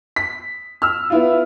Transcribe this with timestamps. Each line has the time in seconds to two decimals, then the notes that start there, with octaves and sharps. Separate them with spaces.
0.16 B6
0.82 E6 F6
1.10 B3 E4 F4